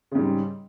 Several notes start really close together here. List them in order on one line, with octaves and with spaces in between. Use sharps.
C#3 G#2 G3